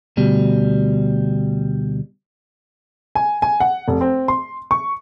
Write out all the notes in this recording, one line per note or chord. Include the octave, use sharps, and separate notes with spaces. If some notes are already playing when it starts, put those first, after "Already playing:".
D2 B2 G3
G#5
G#5
F#5
F1
C4
C6
C#6